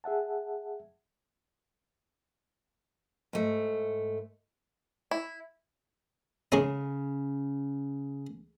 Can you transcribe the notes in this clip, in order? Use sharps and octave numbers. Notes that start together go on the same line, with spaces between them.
G#4 E5 F#5 A5
G#2 A3
E4
C#3 G#3 C#4 D#4